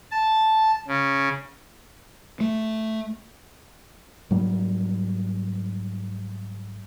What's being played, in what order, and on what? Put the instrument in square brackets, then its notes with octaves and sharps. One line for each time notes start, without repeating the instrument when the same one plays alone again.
[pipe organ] A5
C#3
[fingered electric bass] A3
G#2 F#3 G3 A#3